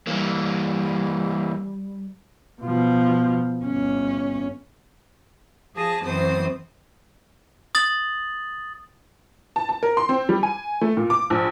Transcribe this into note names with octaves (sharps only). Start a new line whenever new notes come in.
E3 G3 A#3
B2 F3
G1 C#4
F3 G#4 A5 D#6 A#6
F#2 E3 C4 C5 D#6
D#6 A6 F#7
A5
A5
A#4
C6
C4
G3
G#5
A3
A#2
D6
A#1